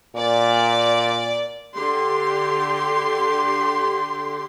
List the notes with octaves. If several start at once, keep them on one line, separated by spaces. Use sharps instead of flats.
A#2 D5
D3 G4 C6